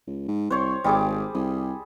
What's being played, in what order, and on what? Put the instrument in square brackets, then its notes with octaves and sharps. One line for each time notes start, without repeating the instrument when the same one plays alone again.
[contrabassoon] C#2
G#2
[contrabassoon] C2 [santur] C5 C#5 C#6
[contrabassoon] G#1 [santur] G3 G#4 D6
[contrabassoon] C2 [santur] D#6